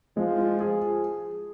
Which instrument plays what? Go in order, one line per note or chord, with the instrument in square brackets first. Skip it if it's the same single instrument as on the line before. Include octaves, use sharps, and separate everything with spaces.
[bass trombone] F3 [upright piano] G#3
[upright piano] F4
G#4